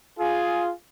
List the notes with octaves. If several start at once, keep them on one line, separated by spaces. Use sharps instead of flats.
F4 G#4